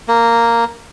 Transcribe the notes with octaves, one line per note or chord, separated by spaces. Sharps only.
A#3